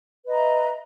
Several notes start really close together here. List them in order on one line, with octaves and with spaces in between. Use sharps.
B4 D#5 A#5 E5